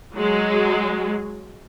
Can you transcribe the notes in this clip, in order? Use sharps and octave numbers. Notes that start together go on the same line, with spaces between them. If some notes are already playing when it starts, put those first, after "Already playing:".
F#3 G#3